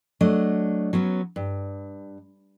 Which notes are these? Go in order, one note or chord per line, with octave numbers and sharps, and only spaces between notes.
F#3 A3 D4 D#5
F#3 B3 C#4
G2